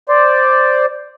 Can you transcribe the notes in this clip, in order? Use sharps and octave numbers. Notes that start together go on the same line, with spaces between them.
C5 D5